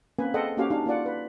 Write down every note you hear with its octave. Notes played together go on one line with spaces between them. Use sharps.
A#3 C4 C#4 B4 G#5
G#4 A4 C5 D#5 F#5 G5
A#3 C#4 F#4 G4 F5 G#5
D4 D#4 G4 F5
A#3 F4 D5 F#5
B4